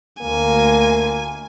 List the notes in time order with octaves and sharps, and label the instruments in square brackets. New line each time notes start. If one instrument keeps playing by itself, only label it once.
[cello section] D2 [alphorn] A#3 [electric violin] G#5